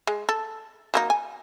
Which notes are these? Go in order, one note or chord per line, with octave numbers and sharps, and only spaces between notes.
G#3
A4
F#3 A#3 D#4
G#5